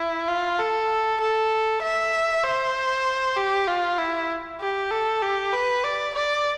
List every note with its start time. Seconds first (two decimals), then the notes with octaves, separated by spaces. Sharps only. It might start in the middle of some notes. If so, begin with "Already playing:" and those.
Already playing: E4
0.28 F4
0.59 A4
1.20 A4
1.82 E5
2.44 C5
3.36 G4
3.67 F4
3.98 E4
4.60 G4
4.91 A4
5.22 G4
5.53 B4
5.84 D5
6.14 D5